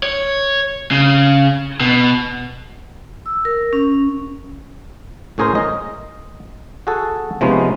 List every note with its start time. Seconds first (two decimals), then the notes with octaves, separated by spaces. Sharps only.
0.03 C#5
0.91 C#3
1.80 B2
3.26 E6
3.45 A#4
3.73 C#4
5.38 A2 C#4 G#4 A#4 C5
5.55 D#5
6.87 F#4 G#4 A4
7.41 C3 F3 G#3 B3 C#4 D#4